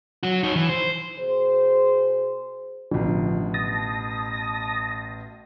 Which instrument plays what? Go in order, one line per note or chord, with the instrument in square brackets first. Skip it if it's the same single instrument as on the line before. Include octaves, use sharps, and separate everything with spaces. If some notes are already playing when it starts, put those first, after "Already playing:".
[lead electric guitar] F#3 F#4
D#4 C#5
E3
C5
[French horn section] B2 G#4 C5
[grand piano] A1 B2 [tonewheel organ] D3 F3
[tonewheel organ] A5 D#6 A#6